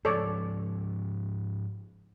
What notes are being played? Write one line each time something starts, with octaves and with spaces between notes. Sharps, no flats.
G#2 F3 A4 C#5 D5